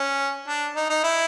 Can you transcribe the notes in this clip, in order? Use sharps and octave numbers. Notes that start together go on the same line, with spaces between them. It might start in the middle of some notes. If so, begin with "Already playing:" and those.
Already playing: C#4
D4
D#4
D#4
E4